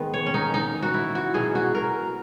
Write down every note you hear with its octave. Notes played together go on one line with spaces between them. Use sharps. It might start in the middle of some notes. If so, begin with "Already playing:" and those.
Already playing: D#3 G#3 B3
C#5
C#4
D#4
D#4
F#4
E4
F#4
B2 F#3 C#4 G#4
F#4
A#4